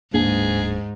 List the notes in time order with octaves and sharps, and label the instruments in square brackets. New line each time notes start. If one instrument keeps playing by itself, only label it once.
[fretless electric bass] D1 A#3 D4 [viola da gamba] G#2 [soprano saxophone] G#4